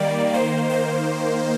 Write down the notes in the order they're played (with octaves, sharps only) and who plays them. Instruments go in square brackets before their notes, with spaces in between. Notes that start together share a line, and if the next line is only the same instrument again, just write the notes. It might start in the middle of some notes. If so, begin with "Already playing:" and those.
Already playing: [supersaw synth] D#3 G3 A#3 D5
D#3 A#3 C5
C5